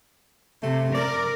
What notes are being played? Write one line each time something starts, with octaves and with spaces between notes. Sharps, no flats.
C3 A3
A#4 D5